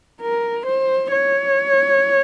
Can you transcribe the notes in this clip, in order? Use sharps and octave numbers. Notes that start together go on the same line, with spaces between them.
A#4
C5
C#5